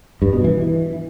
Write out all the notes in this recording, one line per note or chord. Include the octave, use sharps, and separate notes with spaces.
G2
B2
E3